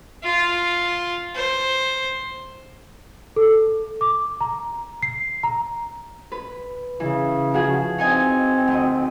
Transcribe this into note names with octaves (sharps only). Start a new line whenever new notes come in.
F4
C5
A4
D6
A#5
C7
A#5
B4
C#3 E3
F3 F#4 G#4
C4 D#4 D#5 G#5
D2 D#5